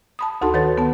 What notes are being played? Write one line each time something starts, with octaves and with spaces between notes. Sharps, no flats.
A5 B5 D#6
D2 D#4 F#4 A4 A5 C6
D#3 B4 C#5 A6
B3 A5